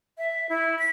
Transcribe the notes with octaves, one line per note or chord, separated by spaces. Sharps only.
E5
E4
B6